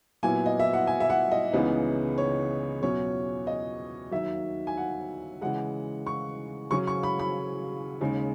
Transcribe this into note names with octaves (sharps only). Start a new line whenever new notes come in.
A#2 F#3 B3 E4 G#5
D#5
E5
F#5
G#5
E5
F#5
D#5
C#2 C#3 E3 B3 D#4
C#5
E2 B2 F#3 C#4 E4 C#5
D#5
D#2 D#3 F#3 E5
G#5
F#5
C#3 E3 G#3 F#5
C#6
C#3 F#3 C#4 C#6
C#6
B5
B5
D#2 C#3 G#3